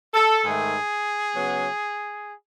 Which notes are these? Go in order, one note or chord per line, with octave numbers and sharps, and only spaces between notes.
A4
G#2 D#3 A3 G#4
C#3 F#3 B3